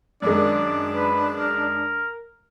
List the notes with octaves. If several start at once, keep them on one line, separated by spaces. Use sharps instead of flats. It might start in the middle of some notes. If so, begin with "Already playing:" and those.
F#2 D#3 G#3 D4 D5
B4
A#4